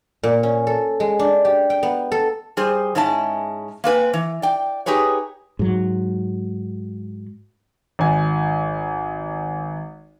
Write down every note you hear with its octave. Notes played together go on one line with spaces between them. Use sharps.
A#2
C#4
A4
G#3
D4
G4
G5
B3
A4
G3 G#4 C5
G#2 G#3 C#4 E4 A5
A#3 C4 B4 G#5
E3
D5 G5
D#4 G4 G#4 B4 C#5
G#2 F#3
G#1 G#5